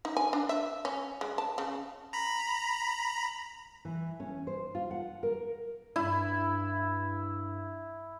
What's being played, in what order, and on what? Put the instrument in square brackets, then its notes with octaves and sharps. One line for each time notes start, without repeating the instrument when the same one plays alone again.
[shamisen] D#4
G#5
D4
E5
C#4
G#3
A5
C#3
[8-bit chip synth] A#5 B5
[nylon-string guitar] E3
C#4
C5
F4
F#5
A#4
[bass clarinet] G2 [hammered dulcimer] E4